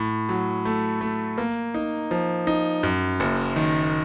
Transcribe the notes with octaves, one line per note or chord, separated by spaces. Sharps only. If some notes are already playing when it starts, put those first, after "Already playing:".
Already playing: A2
F#3
A3
A3
A#3
D#4
F3
D#4
F#2
F#1
D#3